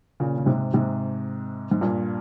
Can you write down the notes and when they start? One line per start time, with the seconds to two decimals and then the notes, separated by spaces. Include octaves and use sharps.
0.20 A#2 C#3
0.38 C#3
0.46 G#2 C3
0.74 G#2 C3
1.71 G#2
1.81 G2 A#2